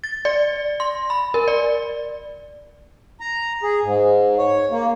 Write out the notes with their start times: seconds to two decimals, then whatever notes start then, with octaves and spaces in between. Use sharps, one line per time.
0.04 A6
0.25 D5
0.80 C6
1.10 B5
1.34 A#4
1.48 D5
3.20 A#5
3.63 G#4
3.83 G#2
4.38 C#5
4.71 A#3